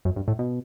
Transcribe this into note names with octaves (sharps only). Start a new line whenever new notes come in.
F#2
G2
A2
B2